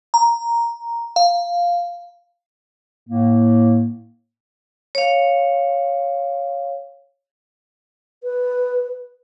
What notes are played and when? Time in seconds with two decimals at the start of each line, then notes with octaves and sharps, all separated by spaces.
0.14 A#5
1.16 F5
3.08 A2 A#3
4.95 C#5 F5
8.23 B4